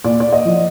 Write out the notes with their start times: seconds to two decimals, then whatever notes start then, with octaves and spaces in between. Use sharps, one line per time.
0.04 A#2 D5
0.20 D5
0.32 D#5
0.45 F3